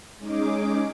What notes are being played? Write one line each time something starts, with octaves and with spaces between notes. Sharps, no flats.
G#3 C#4 D#4 G#4 D6